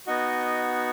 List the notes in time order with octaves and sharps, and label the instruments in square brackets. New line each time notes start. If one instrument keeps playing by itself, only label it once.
[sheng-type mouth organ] B3 D#4 F#4 D#5